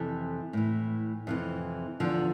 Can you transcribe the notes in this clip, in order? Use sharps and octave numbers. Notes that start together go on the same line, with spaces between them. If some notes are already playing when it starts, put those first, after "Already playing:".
Already playing: F2 C3 E3 A4
A2 E3
F2 C3 E3
E2 D3 F3